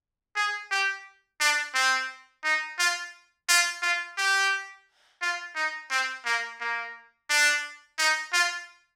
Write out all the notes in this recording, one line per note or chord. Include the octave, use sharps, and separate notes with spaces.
G#4
G4
D4
C4
D#4
F4
F4
F4
G4
F4
D#4
C4
A#3
A#3
D4
D#4
F4